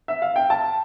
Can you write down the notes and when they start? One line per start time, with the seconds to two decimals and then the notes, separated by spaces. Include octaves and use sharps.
0.08 E5
0.22 F5
0.36 G5
0.50 A5